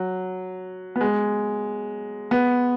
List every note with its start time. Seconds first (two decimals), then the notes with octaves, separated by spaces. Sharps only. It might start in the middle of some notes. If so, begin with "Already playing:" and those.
Already playing: F#3
0.96 B3
1.01 G#3
2.31 B3